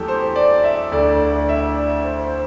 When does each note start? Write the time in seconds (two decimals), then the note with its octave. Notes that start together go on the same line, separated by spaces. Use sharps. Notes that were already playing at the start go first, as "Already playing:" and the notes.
Already playing: E2 F#3 A3 G4 A4
0.08 C5
0.36 D5
0.64 E5
0.92 D2 D3 A3 D5
1.19 D5
1.49 E5
1.76 D5
2.04 C5
2.24 C5